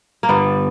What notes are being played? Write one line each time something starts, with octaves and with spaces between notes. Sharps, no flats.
A#3
G2 D3 G3 B3